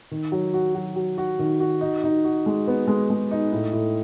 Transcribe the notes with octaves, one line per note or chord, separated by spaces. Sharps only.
D#3
F#3
F#4
F#3
F#3
F#4
D#3
F#4
D#4
D#4
F#4
G#3
B3
G#3
G#3
D#4
A2
A2